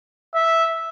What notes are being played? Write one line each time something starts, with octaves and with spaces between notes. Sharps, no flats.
E5